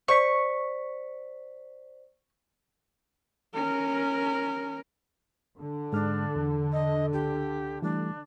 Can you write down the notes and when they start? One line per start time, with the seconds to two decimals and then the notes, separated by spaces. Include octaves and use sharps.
0.08 C5 D5 C#6 B6
3.54 C#4 A#4
5.59 D3
5.93 G#2 G#3 D4 F6
6.36 E2
6.72 D#5
7.13 C#2 G4
7.82 E3 G3 A3 D4